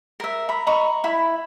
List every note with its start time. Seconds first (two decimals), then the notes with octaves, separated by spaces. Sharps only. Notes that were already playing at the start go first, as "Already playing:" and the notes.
0.20 A#4 E5
0.49 A#5 B5
0.67 D#5 A#5 B5 C#6
1.04 E4 B5